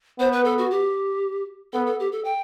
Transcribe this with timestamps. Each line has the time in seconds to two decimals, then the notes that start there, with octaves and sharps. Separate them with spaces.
0.19 B3 C5
0.32 B4
0.45 A4
0.58 F#4
0.71 G4
1.73 B3 A4
1.87 A4
2.00 G4
2.12 A4
2.25 G5